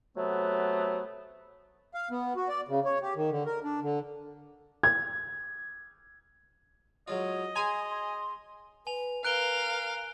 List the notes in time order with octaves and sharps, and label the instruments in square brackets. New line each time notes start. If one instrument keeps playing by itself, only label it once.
[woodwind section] C3 F#3 A3 B3
[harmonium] F5
B3
F#4
D5
C#3
C#5
G4
D#3
D3
A#4
D4
D3
[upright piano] G#6
[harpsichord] F#3 G#3 F4 [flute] C#5 [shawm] D#5
[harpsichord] G#4 A#5 [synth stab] G#5 [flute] C6
[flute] C6
[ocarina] B4 [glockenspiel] G#5 F7
[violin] A#4 F5 [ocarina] B4 [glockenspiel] F#6 D7 G7